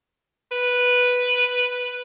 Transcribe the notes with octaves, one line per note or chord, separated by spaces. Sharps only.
B4